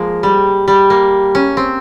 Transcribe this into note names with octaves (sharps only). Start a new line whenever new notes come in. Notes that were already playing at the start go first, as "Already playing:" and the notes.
Already playing: F3 G#3 A#3
G3
G3
A#3
C#4
C4